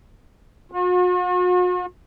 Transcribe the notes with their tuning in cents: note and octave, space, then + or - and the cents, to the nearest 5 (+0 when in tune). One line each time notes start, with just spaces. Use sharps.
F#4 -45